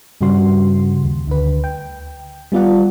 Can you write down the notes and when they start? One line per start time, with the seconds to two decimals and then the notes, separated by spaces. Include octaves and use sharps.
0.21 G2 C#3 G3 F#4 C6
1.04 D#2
1.27 D2 D3 B4
1.64 G5
2.52 G3 B3 F4 D5 F#5